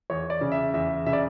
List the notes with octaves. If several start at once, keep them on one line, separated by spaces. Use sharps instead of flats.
E2 C#5
D5
C#3
E5
E2 E5
C#3 E5
D5